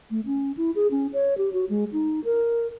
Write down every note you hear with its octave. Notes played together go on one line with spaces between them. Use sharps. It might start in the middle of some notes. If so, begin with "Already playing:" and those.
A3
C#4
E4
G#4
C#4
C#5
G4
F#4
G#3
D#4
A#4